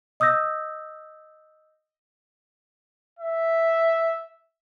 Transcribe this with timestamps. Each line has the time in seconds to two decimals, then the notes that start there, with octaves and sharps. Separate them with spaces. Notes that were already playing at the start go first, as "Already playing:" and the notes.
0.20 D#5 D#6 E6 G6 A#6
3.19 E5